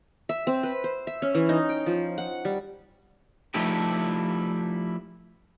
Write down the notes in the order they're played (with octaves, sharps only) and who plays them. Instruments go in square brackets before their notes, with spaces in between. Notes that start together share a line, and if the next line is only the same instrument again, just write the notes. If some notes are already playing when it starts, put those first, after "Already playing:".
[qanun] E5
C4
B4
C5
E5
C#4
E3
D#4
G5
F3
F#5
G3
[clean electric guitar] F3 G3 A3 D#4 E4 G4